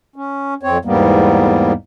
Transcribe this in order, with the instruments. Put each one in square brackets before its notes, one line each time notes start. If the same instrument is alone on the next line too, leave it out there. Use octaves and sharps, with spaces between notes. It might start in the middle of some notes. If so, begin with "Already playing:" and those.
[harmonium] C#4
F2 C4 C#5
E2 G#2 G3 A#3 B3